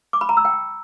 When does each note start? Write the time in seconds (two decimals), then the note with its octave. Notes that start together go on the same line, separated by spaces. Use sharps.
0.13 D6
0.21 B5
0.29 A#5
0.37 E6
0.45 G5